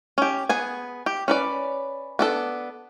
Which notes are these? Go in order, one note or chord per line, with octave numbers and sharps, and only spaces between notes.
C#4 G4
B3 G#4 G#5
G4
C#4 B4 D5
B3 D4 A4